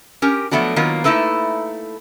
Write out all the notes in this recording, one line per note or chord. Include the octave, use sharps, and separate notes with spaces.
C#4 G4 A#4
F3 F#3 A3 B3 D4 F#4
D#3 F#3 A#3 B3 F4
A3 A#3 D#4 E4 A4 B4